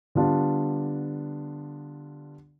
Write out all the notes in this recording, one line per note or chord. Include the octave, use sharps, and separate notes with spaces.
D3 G3 B3 D4 F4